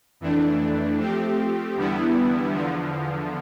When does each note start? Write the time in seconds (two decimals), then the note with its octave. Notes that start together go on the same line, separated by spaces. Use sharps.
0.20 F2 E3 A3 D4
0.98 F3 A3 C4 G4
1.76 E2 D3 G3 B3 E4
2.52 E2 D3 F3